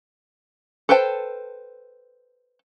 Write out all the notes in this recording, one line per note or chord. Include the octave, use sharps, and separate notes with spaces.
A4 B4 C5 G5 A5